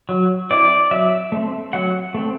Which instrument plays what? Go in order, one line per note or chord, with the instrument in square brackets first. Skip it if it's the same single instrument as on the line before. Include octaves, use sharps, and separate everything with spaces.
[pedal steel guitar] F#3
C4 E4 D5
F#3 E5
A3 C4
F#3 F#5
A3 C4